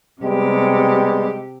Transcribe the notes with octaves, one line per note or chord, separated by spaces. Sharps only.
C3 G3 G#3 B3 G4